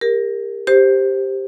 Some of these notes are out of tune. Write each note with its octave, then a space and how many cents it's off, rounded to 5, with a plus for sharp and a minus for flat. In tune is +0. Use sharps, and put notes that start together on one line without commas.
G4 +35 A#4 +0
G4 +0 C5 +5